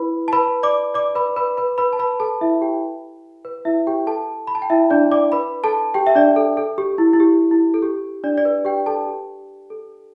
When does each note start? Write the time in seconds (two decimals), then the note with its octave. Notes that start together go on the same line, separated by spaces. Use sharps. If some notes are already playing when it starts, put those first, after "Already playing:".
Already playing: E4 B4 B5
0.28 A5
0.33 B4 B5
0.63 D5 D6
0.94 D5 D6
1.15 B4 B5
1.36 B4 B5
1.57 B4 B5
1.78 B4 B5
1.93 A5
1.99 B4 B5
2.20 A4 A5
2.41 E4 E5
2.61 G4 G5
3.45 B4
3.65 E4 E5
3.87 G4 G5
4.07 A4 A5
4.47 B5
4.55 A5
4.62 G5
4.70 E4 E5
4.90 D4 D5
5.11 D5 D6
5.32 B4 B5
5.64 A4 A5
5.94 G4 G5
6.07 E5
6.15 D4 D5
6.36 A4
6.57 A4
6.78 G4
6.98 E4
7.13 E4
7.20 G4
7.51 E4
7.74 A4
7.82 G4
8.24 D4 D5
8.38 D5
8.45 B4
8.65 G4 G5
8.86 A4 A5
9.07 G4
9.70 A4